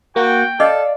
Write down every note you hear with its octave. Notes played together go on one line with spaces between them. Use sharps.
A#3 F#4 G5
A4 D5 D#5 F5